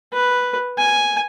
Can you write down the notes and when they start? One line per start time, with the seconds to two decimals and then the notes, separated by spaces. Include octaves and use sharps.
0.13 B4
0.78 G#5